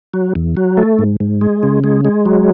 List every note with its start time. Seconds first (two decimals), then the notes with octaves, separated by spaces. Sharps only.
0.14 F#3
0.35 E2
0.57 F#3
0.77 A3
0.99 G#2
1.20 G#2
1.41 G#3
1.63 C#3
1.84 G#3
2.05 G#3
2.25 F#3